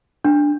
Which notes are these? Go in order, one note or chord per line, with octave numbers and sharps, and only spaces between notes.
D4